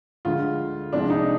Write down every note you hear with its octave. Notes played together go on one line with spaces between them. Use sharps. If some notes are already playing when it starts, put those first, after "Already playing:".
D2 D3 G#3 F4
C2 C3 F3 G#3 D4
D#4